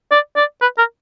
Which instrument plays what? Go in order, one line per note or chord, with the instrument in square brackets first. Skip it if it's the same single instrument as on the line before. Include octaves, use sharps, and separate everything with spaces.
[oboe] D5
D5
B4
A#4